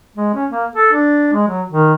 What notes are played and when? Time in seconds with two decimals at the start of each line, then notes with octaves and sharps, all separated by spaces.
0.16 G#3
0.34 C#4
0.50 A#3
0.76 A4
0.93 D4
1.34 G#3
1.48 F#3
1.69 D#3